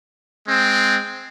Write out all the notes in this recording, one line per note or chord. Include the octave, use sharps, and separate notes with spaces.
G#3 C4